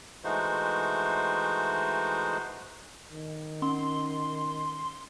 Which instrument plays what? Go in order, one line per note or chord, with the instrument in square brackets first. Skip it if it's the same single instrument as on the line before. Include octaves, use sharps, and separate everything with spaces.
[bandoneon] E3 G#3 A3 D#4 F#4 C5
[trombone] D#3
[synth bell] C#4 [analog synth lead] C6